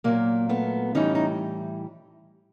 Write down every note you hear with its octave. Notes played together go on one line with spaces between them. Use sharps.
A#2 F#3 A#3
A3 B3
A2 E3 G3 C#4 D#4
D#4